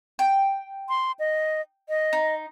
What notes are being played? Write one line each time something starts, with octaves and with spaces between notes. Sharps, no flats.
G5
C6
D#5
D#5
D#4